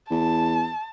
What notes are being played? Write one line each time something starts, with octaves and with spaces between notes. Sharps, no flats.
E2 A5